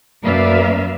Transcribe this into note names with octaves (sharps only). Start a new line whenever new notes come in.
F#2 A#3 B4 D5 E5 F5